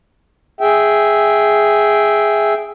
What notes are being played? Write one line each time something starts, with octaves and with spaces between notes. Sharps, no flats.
G#4 E5 G5